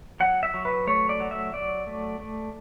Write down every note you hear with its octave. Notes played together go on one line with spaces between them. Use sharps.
F#3 F#5
E5
F#3
B4
A3 C#5
D5
F#3
E5
F#3 D5
A3
A3